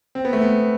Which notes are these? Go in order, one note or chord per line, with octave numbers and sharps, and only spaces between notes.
C4
B3
A3
B3